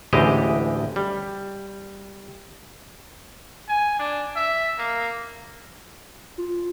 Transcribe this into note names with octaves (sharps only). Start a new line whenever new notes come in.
A1 D2 E3 G#3 G4 D#5
G3
G#5
D4
E5
A#3
F4